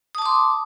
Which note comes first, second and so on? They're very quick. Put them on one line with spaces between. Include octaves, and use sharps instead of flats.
D#6 A5 D6 C6